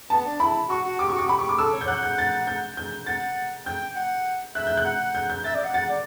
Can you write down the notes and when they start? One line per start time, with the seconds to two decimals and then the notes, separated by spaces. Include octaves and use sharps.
0.10 B3 A5
0.25 D4
0.40 E4 B5
0.69 F#4 C#6
0.85 F#4
0.99 G4 D6
1.09 F#4 C#6
1.19 D6
1.27 G4 B5
1.39 C#6
1.49 D6
1.59 A4 E6
1.73 C#5
1.81 G6
1.88 F#5 F#6
2.03 G6
2.18 A6
2.47 G6
2.77 G6
3.06 F#5 A6
3.66 G5 G6
3.96 F#5
4.55 E5 F#6
4.67 G6
4.77 F#6
4.85 F#5
5.15 G6
5.30 G6
5.44 E5 A6
5.55 D5
5.64 F#5
5.74 F#5 A6
5.89 D5